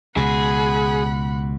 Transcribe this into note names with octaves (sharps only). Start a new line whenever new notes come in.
C#2 B2 G#4 F#5 B5